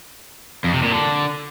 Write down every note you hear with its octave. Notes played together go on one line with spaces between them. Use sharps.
F2
C3
A#2
D3